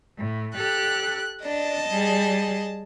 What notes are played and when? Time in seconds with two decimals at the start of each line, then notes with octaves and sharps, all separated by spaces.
0.18 A2
0.56 G4 A4 F#6
1.44 D4 D#5 A5
1.89 G3 G#4